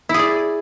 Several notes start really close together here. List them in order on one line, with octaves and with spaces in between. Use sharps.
E4 G#4 D5